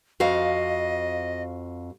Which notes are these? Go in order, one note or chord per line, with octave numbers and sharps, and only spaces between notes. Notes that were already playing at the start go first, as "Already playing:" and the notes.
F2 F#4 D#5 F5